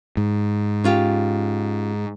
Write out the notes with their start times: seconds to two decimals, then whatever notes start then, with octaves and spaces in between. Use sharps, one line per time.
0.17 G#2
0.84 C#4 F4 G4